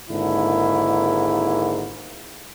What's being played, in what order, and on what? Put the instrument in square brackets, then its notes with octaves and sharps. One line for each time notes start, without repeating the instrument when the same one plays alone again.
[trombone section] G#1 G#2 D3 A#3 E4